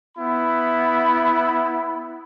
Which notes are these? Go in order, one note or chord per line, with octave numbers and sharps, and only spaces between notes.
B3 E4 B5